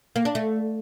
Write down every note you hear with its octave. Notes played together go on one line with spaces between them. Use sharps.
A#3
D4
A3